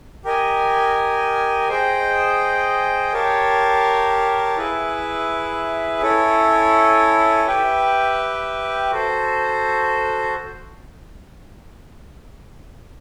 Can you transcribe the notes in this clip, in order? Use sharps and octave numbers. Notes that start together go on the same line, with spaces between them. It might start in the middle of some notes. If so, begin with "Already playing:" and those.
G4 A#4 D#5 G#5
G#4 C5 D#5 G5
G4 A#4 C#5 F5 A5
E4 G#4 B4 E5
C#4 E4 A4 C#5
G4 B4 E5 G5
F#4 A4 C5